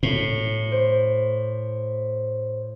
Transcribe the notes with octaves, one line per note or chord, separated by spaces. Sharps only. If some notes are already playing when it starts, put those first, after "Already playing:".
A2
C5